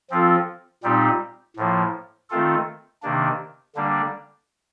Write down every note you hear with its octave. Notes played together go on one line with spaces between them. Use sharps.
F3 C4 F4 A4
A#2 G3 C4 D#4 G4
A2 F3 A#3
D#3 A3 C4 F4 A4
C3 D#3 A#3 D4
D3 G3 A#3 D4